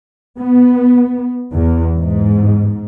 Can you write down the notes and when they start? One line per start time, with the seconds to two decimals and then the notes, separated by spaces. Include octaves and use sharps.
0.37 B3
1.54 E2
1.95 G#2